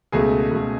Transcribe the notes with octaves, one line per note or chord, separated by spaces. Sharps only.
C#2 B2 A3 G#4
C#2 B2 A3